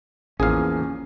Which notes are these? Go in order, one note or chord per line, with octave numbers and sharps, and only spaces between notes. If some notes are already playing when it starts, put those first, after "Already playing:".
A1 E2 F3 A#3 C#4 G#4 F5